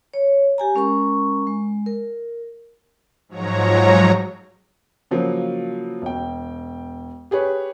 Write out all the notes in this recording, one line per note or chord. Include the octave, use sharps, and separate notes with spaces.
C#5
G4 G#5 A#5
G#3 C#4 A#4 A#5 C#6
G#3
A#4
G#2 F3 F#3 C#5 A#5
C#3 F3 F#3 A#3
E1 G5
G4 G#4 B4 C#5